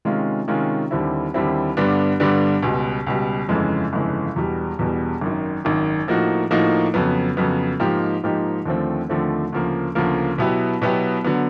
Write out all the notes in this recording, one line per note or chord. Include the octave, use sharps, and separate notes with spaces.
C3 D#3 G#3 C#4 F4
C3 D#3 G#3 C#4 F4
D#2 D3 G3 C4 E4
D#2 D3 G3 C4 E4
G2 D3 G3 B3 D4
G2 D3 G3 B3 D4
C#2 B2 G3
C#2 B2 G3
G1 F2 C#3 E3 G#3
G1 F2 C#3 E3 G#3
E1 E2 B2 G3
E1 E2 B2 G3
G#1 F#2 D#3
G#1 F#2 D#3
A2 F3 A#3 D#4 F#4
A2 F3 A#3 D#4 F#4
F2 C#3 F#3 B3
F2 C#3 F#3 B3
G#2 F3 A#3 D#4 G4
G#2 F3 A#3 D#4 G4
D#2 D3 F3 A3 C4
D#2 D3 F3 A3 C4
D2 C#3 F3 A#3
D2 C#3 F3 A#3
B2 F#3 B3 E4 G4
B2 F#3 B3 E4 G4
D3 F#3 B3